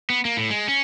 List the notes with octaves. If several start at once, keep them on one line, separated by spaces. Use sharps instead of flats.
B3
A#3
A2
G#3
C#4